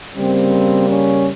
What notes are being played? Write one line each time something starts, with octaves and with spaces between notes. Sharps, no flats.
C#3 G3 A#3 C4
C#4